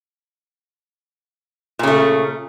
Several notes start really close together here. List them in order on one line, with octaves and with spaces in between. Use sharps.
A#2 C#3 A3